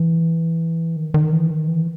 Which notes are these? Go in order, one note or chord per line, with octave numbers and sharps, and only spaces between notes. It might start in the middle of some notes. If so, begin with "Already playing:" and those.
Already playing: E3
D#3
D#3
E3
D#3
E3